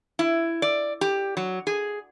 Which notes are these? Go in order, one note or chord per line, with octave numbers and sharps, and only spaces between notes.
E4
D5
G4
F#3
G#4